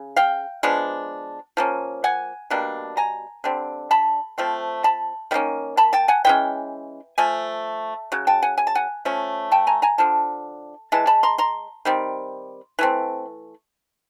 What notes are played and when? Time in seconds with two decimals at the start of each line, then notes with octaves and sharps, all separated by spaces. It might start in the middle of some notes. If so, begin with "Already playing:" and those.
Already playing: C#3
0.16 F5 G5
0.63 F3 G#3 B3 D4
1.57 F3 A#3 C#4
2.04 F#5 G#5
2.50 B2 G3 A#3 D4
2.97 G#5 A#5
3.44 D3 G3 C4
3.91 A5 B5
4.38 F3 A3 C4
4.84 A5 B5
5.31 D#3 G3 A#3 C#4
5.77 A5 B5
5.93 G5 A5
6.08 F#5 G#5
6.25 E3 G#3 C#4 G5
7.18 F3 A3 G#5
8.12 C#3 F#3
8.27 G5 A5
8.42 F#5 G#5
8.58 G#5
8.67 A5
8.75 F#5 G#5
9.05 F3 A3 C#4
9.52 G5 A5
9.67 G#5 A#5
9.82 G#5 A#5
9.98 D3 F3 A5
10.92 E3 G#3 A5
11.07 A5 B5
11.23 A#5 C6
11.38 A#5 C6
11.85 D#3 G3 C4
12.79 E3 A3 C4